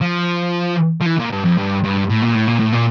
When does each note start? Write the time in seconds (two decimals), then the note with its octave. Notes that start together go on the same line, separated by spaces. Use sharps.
0.01 F3
1.01 F3
1.06 E3
1.19 A#2
1.32 G2
1.45 F2
1.58 G2
1.84 G2
2.10 A2
2.23 A#2
2.35 A2
2.48 A#2
2.60 A2
2.72 A#2